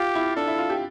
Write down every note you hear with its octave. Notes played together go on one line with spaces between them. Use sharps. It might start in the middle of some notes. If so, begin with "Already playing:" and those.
Already playing: F4 G4
E4
D4 A4
E4
F4
G4